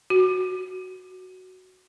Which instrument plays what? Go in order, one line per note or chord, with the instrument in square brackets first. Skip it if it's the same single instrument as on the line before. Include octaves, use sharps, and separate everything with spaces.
[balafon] F#4